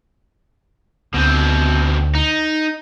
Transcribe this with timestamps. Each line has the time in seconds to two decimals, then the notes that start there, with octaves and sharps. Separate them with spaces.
1.14 D2 B2 C4
2.15 D#4